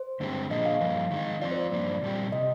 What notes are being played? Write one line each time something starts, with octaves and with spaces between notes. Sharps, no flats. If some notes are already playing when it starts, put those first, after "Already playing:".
Already playing: C5
G2 D3 G#3 C4 G4
A#2 F3 A#3 D4 G#4 D#5
F5
G2 F3 A#3
D#3 G#3 D#4
F3 C4 F4 D5
C5
D5
G2 F3 A#3 D4
A#2 G3 C4 G4
C3 D#5